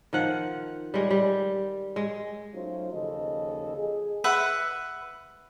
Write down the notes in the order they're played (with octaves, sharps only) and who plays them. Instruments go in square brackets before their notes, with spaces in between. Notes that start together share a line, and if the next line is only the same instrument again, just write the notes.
[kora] D#3 F3 F#5
G3 G#3
G3
G#3
[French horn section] F#3 A3 C#4 D#4 F4 C5
D#2 C#3 F3 A4 D#5
G#4
[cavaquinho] B4 E5 F#5